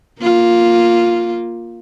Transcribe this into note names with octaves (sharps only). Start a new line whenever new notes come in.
A#3 F4